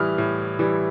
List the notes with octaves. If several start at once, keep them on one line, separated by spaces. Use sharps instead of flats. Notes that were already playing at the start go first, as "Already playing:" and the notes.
Already playing: A2 E3 G3 D#6 F6
A2
E3 G3